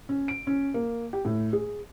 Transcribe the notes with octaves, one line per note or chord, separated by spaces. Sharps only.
C#4
D7
C#4
A#3
G4
A2
G#4